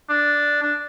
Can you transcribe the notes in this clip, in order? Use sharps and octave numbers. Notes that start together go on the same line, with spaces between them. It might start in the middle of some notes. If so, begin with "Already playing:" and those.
D4
D4